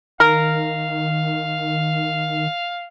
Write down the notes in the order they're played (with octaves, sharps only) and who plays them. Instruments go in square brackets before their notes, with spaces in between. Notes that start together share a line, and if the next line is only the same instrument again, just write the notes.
[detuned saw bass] D#3 [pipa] A#4 [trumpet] F5